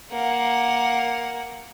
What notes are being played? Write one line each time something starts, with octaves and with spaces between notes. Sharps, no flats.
A#3 F#5